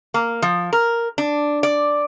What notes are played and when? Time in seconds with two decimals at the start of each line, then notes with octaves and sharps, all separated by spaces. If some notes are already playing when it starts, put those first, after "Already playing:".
0.14 A#3
0.42 F3
0.73 A#4
1.18 D4
1.63 D5